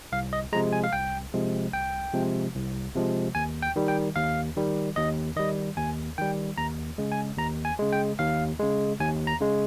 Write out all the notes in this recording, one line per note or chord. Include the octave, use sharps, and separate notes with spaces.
C2 F5
D#5
C3 F3 G#3 A#5
G#5
F5
C2 G5
C3 F3 G#3
C2 G5
C3 F3 G#3
C2
C3 F3 G#3
D#2 G#5
G5
D#3 G3
G5
D#2 F5
D#3 G3
D#2 D#5
D#3 G3 D#5
D#2 G#5
D#3 G3 G5
D#2 A#5
C#3 G#3
G#5
D#2 A#5
G#5
C#3 G#3
G5
D#2 F5
C#3 G#3
D#2 G#5
A#5
C#3 G#3